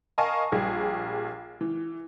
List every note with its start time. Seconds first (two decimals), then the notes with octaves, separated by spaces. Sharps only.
0.18 A#4 D#5 F5 G#5 A5 C#6
0.52 A#1 G3 G#4
1.61 E3